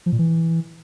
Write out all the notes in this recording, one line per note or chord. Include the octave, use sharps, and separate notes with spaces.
F3
A#2
E3